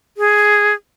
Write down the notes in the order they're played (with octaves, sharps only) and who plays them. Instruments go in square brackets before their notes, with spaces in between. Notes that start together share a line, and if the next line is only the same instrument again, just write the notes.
[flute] G#4